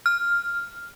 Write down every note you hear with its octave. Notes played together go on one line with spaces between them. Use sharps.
F6